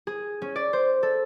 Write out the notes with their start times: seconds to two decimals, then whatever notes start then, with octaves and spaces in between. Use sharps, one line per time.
0.07 G#4
0.42 C#4
0.56 D5
0.73 C5
1.03 A4